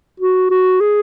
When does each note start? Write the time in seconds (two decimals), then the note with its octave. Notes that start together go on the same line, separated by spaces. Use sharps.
0.20 F#4
0.50 F#4
0.81 G#4